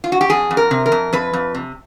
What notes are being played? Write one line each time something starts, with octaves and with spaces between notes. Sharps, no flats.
F4
F#4
G4
F2 G#4
F2
A#4
C3
A#4
F2
F2 B4
F2
C3